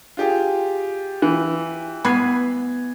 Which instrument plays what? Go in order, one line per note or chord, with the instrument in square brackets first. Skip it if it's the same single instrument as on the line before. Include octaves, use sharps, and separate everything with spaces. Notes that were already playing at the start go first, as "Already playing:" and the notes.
[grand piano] F4 G4 G#4
[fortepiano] E3
[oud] B3 [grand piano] B5 G#6 C7